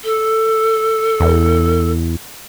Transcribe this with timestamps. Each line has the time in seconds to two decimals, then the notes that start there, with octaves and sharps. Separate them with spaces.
0.04 A4
1.20 E2